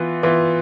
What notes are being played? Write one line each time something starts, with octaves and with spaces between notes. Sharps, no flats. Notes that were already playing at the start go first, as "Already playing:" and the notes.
Already playing: E3 B3 F4
E3 B3 F4